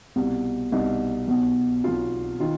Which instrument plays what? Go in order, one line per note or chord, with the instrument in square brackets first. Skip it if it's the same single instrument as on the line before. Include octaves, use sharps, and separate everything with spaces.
[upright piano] C2 B2
C2 B2 D#4
B1 B2
B1 B2 F4
D#3 F4